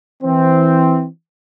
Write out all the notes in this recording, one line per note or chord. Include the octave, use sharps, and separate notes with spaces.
E3 C4